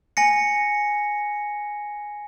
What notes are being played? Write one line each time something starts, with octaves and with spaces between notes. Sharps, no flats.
G#5 A#6 C#7